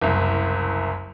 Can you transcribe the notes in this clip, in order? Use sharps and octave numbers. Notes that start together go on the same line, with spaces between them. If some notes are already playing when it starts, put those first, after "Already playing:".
F#1 C2